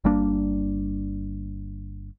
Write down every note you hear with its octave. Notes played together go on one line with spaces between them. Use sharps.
G1 G3 A#3 D4